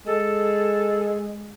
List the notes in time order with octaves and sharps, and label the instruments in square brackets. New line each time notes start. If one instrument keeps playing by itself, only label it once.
[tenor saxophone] G#3 [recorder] A4